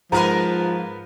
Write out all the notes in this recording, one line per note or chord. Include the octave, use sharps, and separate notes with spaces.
G#2 F3 B3 A#4 B4 A#5